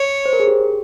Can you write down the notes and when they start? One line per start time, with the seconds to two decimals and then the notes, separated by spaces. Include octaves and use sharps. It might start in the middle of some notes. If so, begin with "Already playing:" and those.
Already playing: C#5
0.26 C5
0.33 A#4
0.40 G#4
0.47 G4